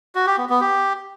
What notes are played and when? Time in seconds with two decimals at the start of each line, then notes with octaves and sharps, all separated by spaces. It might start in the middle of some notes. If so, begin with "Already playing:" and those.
0.15 F#4
0.27 G4
0.38 B3
0.49 B3
0.61 G4